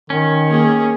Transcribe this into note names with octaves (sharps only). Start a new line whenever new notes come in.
D#3 C#4
A#3 G#4